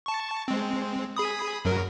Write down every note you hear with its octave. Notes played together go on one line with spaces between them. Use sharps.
A5 C#6
G#3 C4
G#4 B5 D#6
F#2 F#3 A#4